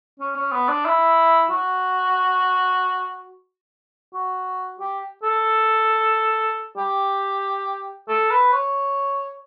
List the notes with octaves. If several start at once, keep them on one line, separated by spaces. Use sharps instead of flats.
C#4
C#4
B3
D4
E4
F#4
F#4
G4
A4
G4
A4
B4
C#5